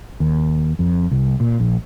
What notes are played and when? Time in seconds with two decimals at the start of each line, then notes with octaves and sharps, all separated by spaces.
0.20 D#2
0.79 F2
1.11 C2
1.40 A#2
1.60 A#1